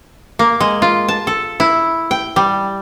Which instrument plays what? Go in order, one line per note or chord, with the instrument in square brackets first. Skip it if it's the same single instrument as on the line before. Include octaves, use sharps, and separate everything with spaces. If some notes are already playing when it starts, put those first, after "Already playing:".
[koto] A#3
G#3
F4
A5
A4
E4
G5
G3